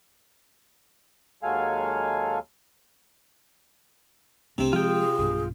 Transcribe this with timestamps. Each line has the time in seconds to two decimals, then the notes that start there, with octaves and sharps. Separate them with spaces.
1.43 D#2 F#3 G#3 A4 F5 G#5
4.58 C2 C3 A3 C4 D4
4.73 F3 G#3 F4 G#4 G5
5.19 B1 G2